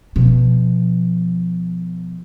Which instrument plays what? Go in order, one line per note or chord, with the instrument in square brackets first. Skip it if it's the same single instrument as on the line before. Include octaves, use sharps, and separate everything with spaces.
[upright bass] B2 F3